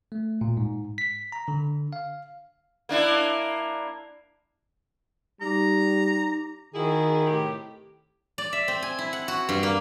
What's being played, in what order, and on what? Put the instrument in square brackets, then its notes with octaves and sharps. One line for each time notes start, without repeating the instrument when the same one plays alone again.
[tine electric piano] A3
A#2
G#2
B6
A#5
D3
F5
[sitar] A#3 D4 E4
[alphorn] G3 [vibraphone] D#4 D6 [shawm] A#5
[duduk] D#3 [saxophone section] E4 F#4 G#4
[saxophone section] A2 C3 G4
[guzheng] D5
E5
C4
G#5
E4
F#5
F#4
G2
A#3